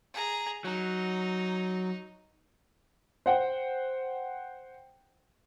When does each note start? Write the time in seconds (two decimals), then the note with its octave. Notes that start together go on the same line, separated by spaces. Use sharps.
0.14 G#4 A#5
0.64 F#3 D#4
3.26 C5 F#5 G5